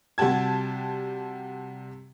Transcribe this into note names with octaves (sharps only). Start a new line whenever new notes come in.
C3 G3 F#4 G4 A5 G#6